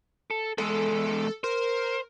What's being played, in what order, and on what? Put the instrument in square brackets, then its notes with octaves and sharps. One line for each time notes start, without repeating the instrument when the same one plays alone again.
[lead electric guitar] A4
[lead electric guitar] E2 G#3 [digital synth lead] A4
[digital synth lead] A#4 [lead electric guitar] C5